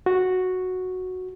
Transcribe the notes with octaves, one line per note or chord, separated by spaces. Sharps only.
F#4